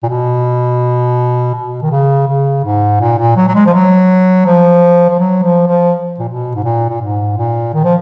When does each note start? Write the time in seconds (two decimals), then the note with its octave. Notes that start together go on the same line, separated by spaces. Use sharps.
0.03 A#2
0.08 B2
1.54 B2
1.82 D#3
1.91 C#3
2.27 C#3
2.64 G#2
3.00 A#2
3.18 A#2
3.37 F#3
3.48 F#3
3.55 G#3
3.66 F3
3.73 F#3
4.46 F3
5.09 F3
5.19 F#3
5.43 F3
5.67 F3
6.19 A#2
6.28 B2
6.55 G#2
6.64 A#2
6.89 A#2
7.01 G#2
7.37 A#2
7.74 D#3
7.84 F3